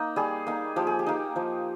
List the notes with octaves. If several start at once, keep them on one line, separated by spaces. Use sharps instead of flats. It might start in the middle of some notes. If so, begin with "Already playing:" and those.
Already playing: A#3 D#4
G3 G#4
A#3 D#4
F3 G4
G#4
G4
A#3 D#4
F3